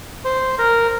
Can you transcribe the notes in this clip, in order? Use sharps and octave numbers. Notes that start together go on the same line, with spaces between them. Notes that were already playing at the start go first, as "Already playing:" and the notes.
C5
A#4